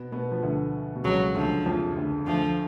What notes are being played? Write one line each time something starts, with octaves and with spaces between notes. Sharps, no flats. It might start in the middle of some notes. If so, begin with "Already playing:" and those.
Already playing: B2 B3
B2 B3
F3
D2 D3
B2
C#2 C#3 F#3
D2 D3 F3
F2 F3
D2 D3
D2 D3 F3